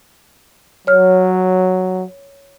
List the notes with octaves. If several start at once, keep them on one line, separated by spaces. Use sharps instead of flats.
F#3 C#5 F6